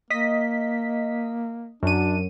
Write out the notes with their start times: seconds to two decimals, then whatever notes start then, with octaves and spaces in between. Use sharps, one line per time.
0.10 A#3 D#5 B6
1.83 F#2 D4 D#7